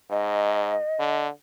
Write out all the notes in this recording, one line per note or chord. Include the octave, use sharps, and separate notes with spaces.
G#2 D#5
D3